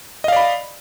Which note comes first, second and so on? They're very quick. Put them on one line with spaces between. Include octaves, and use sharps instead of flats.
D#5 F5 D5 B5